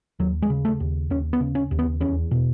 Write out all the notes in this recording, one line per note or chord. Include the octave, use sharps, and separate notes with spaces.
D#2 F#3
G#3
C#3
A3
D#2
D#2 C#4
B3
C#3
C#4
D#2
B3
E2 C#4
B2